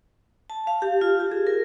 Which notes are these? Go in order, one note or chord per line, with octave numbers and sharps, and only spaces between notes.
A5
F5
G4
F4
G4
G#4
A#4